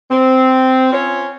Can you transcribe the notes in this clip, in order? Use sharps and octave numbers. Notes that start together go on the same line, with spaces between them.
C4
C#4 F4 C#5